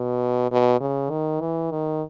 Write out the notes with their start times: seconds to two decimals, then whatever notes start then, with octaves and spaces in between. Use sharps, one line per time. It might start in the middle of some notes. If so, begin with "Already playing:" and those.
Already playing: B2
0.51 B2
0.80 C#3
1.10 D#3
1.41 E3
1.71 D#3